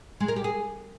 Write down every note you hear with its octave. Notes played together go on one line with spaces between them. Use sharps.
G#3
A#4
G4
G#4